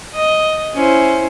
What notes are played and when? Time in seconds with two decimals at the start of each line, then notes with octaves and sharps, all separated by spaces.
0.15 D#5
0.74 C#4 E4 C5